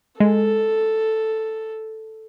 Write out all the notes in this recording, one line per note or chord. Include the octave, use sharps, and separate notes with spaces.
G#3 A4